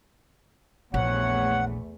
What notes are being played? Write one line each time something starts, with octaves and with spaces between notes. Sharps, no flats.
A#1 E2 A3 C#5 F#5